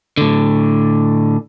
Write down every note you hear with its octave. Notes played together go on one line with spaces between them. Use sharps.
A2 D3